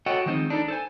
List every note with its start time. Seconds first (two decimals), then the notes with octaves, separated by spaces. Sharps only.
0.06 F#4 A4 C#5 D#5 F#5 G5
0.26 D#3 F3 G#3 C4 D#4
0.50 D4 D#4 A4
0.68 A4 C5 G#5